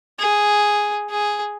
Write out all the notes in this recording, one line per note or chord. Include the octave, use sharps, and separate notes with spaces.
G#4
G#4